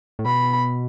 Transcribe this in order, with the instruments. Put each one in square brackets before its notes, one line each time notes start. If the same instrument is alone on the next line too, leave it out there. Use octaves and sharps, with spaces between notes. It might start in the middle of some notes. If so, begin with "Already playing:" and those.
[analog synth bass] A2
[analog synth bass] B2 [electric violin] B5